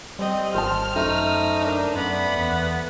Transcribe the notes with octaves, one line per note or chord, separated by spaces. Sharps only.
G3 C4 D#5
G#1 C5 A5 F6
F#2 A3 D#4
D4 A#4
F#2 B3 D5 B5
E2